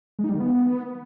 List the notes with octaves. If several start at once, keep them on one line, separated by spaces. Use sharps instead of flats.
G#3
D#4
G3
D#3
B3